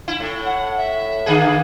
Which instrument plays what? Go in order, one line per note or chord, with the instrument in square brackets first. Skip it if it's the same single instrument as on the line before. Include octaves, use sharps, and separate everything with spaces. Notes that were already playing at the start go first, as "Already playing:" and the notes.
[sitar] E4
A2
[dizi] F#5
E5
[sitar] D3 A#3 G#4